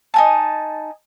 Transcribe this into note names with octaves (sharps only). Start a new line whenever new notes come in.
D#4 G#5 A5